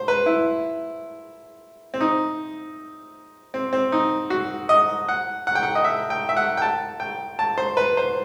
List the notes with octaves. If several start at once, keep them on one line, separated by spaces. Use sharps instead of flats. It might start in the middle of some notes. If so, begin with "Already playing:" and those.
Already playing: C5
B4
E4
C4
D#4
C4
C4
D#4
F#4
D#5
F#5
F#5
G5
F#5
D#5
E5
G5
E5
F#5
G5
A5
G5
A5
C5
B4
C5